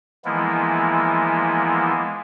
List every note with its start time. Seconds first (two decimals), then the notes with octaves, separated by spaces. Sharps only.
0.25 E3 F3 G#3 A#3 B3 E4